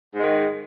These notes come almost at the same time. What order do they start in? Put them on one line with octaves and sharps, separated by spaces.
G#2 G#3 D#3